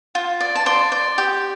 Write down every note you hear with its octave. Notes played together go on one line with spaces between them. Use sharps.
F4
D5
A5
D5 C6
D5
G4